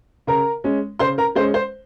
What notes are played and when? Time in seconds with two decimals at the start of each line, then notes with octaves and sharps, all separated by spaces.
0.27 C#3 A#4 A#5
0.64 G#3 C#4
0.99 C#3 C5 C6
1.18 A#4 A#5
1.35 G#3 C5
1.39 C#4
1.54 C5